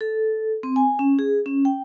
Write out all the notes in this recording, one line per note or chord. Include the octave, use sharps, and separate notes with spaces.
A4
C4
G#5
C#4
G#4
C#4
G5